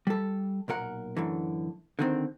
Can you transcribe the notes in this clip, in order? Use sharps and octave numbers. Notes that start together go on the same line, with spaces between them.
G3 A4
B1 A#2 A#4 F#5
F#2 A2 D3 E3
D3 D#3 C4